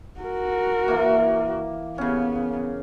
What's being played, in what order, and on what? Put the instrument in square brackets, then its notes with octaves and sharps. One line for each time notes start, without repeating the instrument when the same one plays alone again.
[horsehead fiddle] F#4 A#4
[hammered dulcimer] E3 A#3
[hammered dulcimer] C#3 C#4 [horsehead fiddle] B3